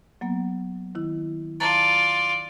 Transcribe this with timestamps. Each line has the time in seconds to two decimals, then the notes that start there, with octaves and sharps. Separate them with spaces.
0.21 F#3 A#3 B3
0.95 D#3 E4
1.60 F4 D5 A5 A#5 A6